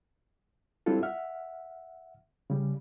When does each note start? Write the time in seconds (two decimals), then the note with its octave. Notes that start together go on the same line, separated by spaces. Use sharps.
0.86 G3 C4 D4 E4 F4 A4
1.03 E5 F#5 F6
2.50 C#3 G3